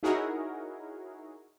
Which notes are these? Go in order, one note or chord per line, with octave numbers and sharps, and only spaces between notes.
D#4 E4 F#4 G#4 A#4 C#5